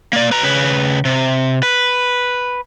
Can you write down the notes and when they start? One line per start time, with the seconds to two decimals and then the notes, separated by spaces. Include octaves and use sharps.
0.13 A#3 D5
0.31 B4 A#5
0.43 C#3 B4
1.05 C3
1.63 B4